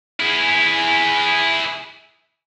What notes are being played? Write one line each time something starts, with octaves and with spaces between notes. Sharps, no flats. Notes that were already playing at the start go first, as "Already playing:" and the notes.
E4 G#4